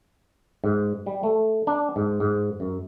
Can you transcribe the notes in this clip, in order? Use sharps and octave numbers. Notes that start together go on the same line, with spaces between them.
G#2
G3
A3
D4
G#2
G#2
F#2